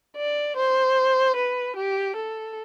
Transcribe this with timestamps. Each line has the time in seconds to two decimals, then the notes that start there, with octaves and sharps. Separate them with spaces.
0.17 D5
0.57 C5
1.36 B4
1.76 G4
2.16 A4